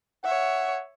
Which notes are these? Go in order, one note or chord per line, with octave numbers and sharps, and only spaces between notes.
C#5 E5 F#5